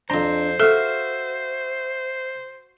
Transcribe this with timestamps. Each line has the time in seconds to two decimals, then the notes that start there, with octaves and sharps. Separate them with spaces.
0.10 F2 D4 C5 A#5 C6
0.60 F#4 A4 E5 F5